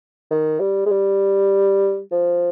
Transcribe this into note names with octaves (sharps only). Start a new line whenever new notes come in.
D#3
G3
G#3
G3
F3